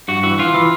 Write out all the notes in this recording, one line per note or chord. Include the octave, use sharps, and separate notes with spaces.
G2 F#4
E3 F#4
E3 F4
E3